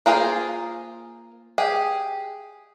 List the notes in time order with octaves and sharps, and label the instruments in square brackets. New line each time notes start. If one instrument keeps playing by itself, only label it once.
[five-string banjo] A#3 F4 G#4 A#4 C5
G4 G#4